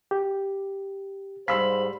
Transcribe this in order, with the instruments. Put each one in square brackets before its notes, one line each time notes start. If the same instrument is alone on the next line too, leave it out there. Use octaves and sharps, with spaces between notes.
[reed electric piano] G4
[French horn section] G#2 G3 C5 [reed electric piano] F5 [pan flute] B5 [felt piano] C6 E6 B6